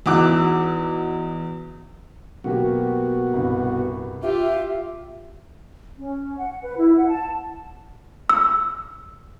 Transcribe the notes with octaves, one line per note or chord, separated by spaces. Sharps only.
E2 D#4 F#4 D6 E6 F#6
B2 F#3 A#3 F#4 G4
C2 G2
F4 G4 E5
C#4
F#5
B4
E4
F#5
A5
E6